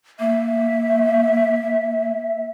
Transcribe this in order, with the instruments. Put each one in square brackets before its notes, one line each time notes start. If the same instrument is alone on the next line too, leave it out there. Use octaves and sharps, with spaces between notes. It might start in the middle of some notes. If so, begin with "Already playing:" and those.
[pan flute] A#3 [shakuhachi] E5